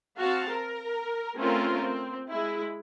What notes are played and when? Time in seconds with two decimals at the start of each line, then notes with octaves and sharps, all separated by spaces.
0.18 C4 F#4 F5 A5
0.49 A#4
1.36 A3 C4 C#4 F4 A#4
1.78 C4
2.30 G#3 E4